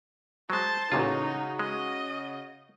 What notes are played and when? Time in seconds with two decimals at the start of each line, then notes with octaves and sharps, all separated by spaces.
0.50 F#3 G#3 C5 A5
0.92 A1 A#2 C#3 D#4 F4 F#4 C#5
1.59 G#3 D#5